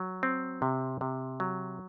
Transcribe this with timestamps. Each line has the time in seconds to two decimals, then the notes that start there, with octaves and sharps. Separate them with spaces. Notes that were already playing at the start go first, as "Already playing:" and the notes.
Already playing: F#3
0.23 C4
0.62 C3
1.01 C3
1.40 F#3